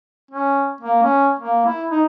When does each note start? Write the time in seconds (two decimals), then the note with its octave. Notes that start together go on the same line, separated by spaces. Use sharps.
0.31 C#4
0.80 A#3
1.03 C#4
1.39 A#3
1.66 E4
1.91 D#4